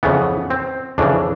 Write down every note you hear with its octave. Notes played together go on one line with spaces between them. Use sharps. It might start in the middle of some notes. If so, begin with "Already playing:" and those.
F2 C#3 E3 B3
C4
F2 C#3 E3 D4